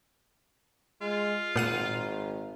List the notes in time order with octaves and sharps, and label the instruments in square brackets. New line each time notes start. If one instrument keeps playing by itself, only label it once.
[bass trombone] G#3 [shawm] F4
[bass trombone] G#1 [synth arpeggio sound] A#2 F#5 D#7